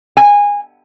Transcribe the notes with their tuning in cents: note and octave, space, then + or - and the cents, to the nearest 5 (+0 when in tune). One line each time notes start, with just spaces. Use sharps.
G#5 -20